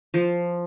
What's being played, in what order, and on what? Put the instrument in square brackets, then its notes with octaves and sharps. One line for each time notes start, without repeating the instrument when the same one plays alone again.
[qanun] F3